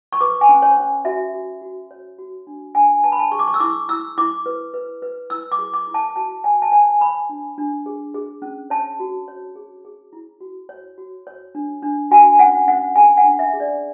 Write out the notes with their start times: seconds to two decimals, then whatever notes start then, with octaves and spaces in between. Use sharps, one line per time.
0.13 C#6
0.20 B4 D6
0.41 G#5
0.49 C#4
0.62 C#5
0.77 C#4
1.05 F#4 E5
1.34 F#4
1.62 F#4
1.91 C#5
2.18 F#4
2.47 D4
2.75 D4 G#5
3.04 B4 A5
3.12 B5
3.19 A5
3.31 G#4 C#6
3.39 D6
3.47 C#6
3.54 E6
3.60 E4 D6
3.89 E4 E6
4.18 E4 D6
4.46 B4
4.74 B4
5.02 B4
5.30 E4 E6
5.52 D6
5.58 G#4
5.74 D6
5.87 E4
5.94 A5
6.16 F#4 A5
6.44 C#5 G#5
6.62 A5
6.72 C#5 G#5
7.01 C#5 B5
7.29 D4
7.58 D4
7.86 G#4
8.14 G#4
8.42 C#4
8.70 C#5 A5
9.00 F#4
9.28 C#5
9.56 G#4
9.85 G#4
10.13 E4
10.41 F#4
10.69 C#5
10.98 F#4
11.27 C#5
11.55 D4
11.82 D4
12.11 F#4 G#5
12.39 C#4 F#5
12.68 C#4 F#5
12.96 G#4 G#5
13.17 F#5
13.24 D4
13.39 E5
13.53 G#4
13.60 D5